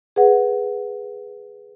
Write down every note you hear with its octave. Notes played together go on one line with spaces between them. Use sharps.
G#4 B4 F#5